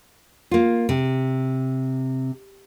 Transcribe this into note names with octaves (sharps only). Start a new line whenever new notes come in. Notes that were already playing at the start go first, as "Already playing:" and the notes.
A#3 F4
C3